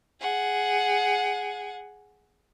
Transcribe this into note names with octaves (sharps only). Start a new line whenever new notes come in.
G#4 F#5